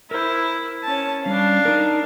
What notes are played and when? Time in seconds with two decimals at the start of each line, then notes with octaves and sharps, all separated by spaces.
0.11 E4 A#4 C5
0.83 C#4 A5
1.26 G3 C#4 D4 F5
1.65 D#4 A#4